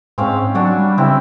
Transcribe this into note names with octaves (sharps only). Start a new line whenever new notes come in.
G#2 C4 C#4 F5
F#3 D4 F#4 C#5
G3
C#3 C4 E4